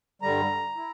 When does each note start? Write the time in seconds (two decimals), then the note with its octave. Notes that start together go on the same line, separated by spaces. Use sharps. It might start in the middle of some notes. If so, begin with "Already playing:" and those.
0.22 G2 D3 G3 A#5
0.76 E4